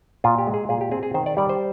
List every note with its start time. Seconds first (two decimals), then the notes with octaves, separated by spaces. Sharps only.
0.24 A#2 F4
0.38 G4
0.47 G#3
0.54 G#4
0.69 A#2 G#4
0.81 G4
0.91 C4 G#4
1.03 G#4
1.14 D#3 C5
1.26 D5
1.37 G3 D5
1.49 C5